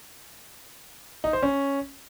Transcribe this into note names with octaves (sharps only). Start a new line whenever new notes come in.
D#4
C5
C#4